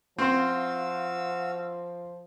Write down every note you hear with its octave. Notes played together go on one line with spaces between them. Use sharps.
F3 C4 F#4 C5 F5 E6